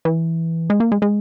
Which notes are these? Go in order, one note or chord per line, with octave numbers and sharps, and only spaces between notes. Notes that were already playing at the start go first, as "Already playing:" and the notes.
E3
G#3
A#3
G#3
G#3